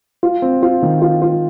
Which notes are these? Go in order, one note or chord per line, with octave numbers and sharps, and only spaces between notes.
F4
C4
F4
D#3
F4
F4